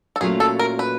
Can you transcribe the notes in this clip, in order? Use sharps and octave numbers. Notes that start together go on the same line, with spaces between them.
A4
A#2 F#3 A3 C#4 F4 G#4
A4
A#4
B4